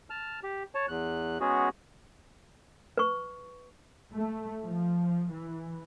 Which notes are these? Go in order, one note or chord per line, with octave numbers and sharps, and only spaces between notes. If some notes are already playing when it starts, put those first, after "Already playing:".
A5 F6
G4
C#5 A5
E2 F#6
G#3 B3 C#4 F#4 G#4
B4 C#6
A3
F3
E3